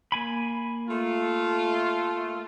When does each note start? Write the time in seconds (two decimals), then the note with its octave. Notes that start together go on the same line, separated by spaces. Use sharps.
0.12 A#3 G#5 B5
0.89 A3 F4